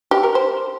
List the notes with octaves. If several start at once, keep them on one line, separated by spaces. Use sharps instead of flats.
G4
A#4
C5